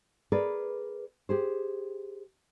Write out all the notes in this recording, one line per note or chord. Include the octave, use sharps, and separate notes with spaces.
G#4 A#4 B4 D5
G4 G#4 C5